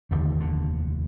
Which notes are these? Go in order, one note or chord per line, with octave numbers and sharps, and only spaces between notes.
F1 D#2 D3 D#3
D3